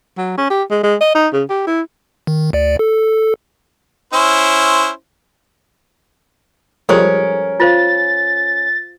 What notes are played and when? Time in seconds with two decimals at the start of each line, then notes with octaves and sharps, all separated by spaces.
0.17 F#3
0.38 C#4
0.50 G4
0.71 G#3
0.83 G#3
1.01 D#5
1.15 D#4
1.33 C#3
1.49 G4
1.67 E4
2.27 D#3
2.53 D2 D5
2.79 A4
4.13 C#4 E4 C5
6.89 F3 G3 G#3 C#4 A4 A#4 C5
7.60 F4 C5 F5 A6